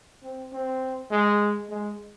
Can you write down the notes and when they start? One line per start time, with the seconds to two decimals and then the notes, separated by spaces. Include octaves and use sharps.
0.23 C4
0.53 C4
1.11 G#3
1.70 G#3